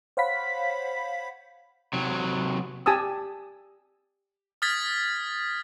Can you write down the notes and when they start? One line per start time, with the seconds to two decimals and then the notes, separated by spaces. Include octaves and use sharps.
0.17 C5 C#5 F5 F#5 B5 B6
1.93 C3 F#3
2.86 G4 G#5 A5 D#6 E6
4.62 D#6 F6 G#6 A6 B6